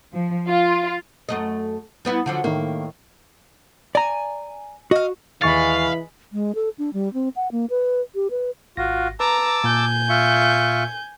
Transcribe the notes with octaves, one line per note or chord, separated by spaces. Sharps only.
F3
F4
F#2 A3 D#5
G3 B3 E4
D3 F3 F#3
A2 D#3 A#3
D5 G#5 A#5
F#4 D#5 F5
D#2 E3 G#3 F5 B5 C#6 A6
G#3
A4
D4
G3
C4
F#5
A#3
B4
G4
B4
G#1 F4 F#4 A#6
B4 A5 A#5 D6 E6
A#2 G#5 G6
F4 E5 C#6